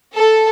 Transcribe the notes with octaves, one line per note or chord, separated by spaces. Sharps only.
A4